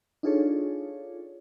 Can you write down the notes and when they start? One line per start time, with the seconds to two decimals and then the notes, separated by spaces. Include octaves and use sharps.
0.23 D4 D#4 F4 G#4 A4 C#5